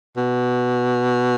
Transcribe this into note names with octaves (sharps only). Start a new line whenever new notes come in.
B2